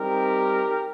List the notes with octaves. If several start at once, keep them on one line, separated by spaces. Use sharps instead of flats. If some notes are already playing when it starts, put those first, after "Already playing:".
Already playing: G3 C4 D#4 G4 A#4